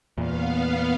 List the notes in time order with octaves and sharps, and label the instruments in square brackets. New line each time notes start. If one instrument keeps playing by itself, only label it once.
[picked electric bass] E2 A#2 [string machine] B3 F5